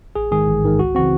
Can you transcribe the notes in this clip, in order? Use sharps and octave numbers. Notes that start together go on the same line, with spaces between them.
A1 G#4
G#2 D#3 G#3 G#4
A1
G#2 D#3 G#3
C#2 F#4
C#3 E3 C4 F#4